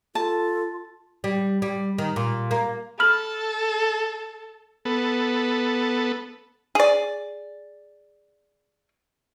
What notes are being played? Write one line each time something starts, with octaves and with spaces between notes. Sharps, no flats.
F4 A4 A5
G3
G3
D#3
A#2
A#3
A4 B5 F6 F#7
B3 A4
G#4 D5